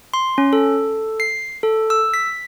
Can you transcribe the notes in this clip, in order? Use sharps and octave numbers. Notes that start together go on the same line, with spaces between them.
C6
C#4
A4
C7
A4
E6
B6